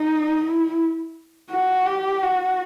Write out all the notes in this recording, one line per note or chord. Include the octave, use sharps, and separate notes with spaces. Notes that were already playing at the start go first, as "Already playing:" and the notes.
Already playing: D#4
E4
F#4
G4
F#4